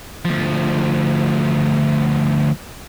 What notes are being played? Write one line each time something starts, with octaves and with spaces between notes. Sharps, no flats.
D2 F3